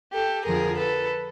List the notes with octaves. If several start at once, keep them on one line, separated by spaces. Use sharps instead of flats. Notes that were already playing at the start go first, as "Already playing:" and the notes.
G4 A4
F2 D3 F3 G#4 A#4
A4 B4